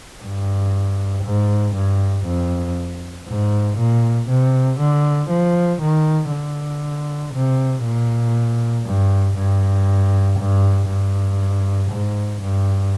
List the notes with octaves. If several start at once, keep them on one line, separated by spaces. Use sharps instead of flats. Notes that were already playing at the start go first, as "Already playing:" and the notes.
G2
G#2
G2
F2
G#2
A#2
C3
D3
F3
D#3
D3
C3
A#2
G2
G2
G2
G2
G#2
G2